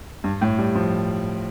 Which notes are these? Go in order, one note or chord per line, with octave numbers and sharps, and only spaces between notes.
G2
A2
G3
F3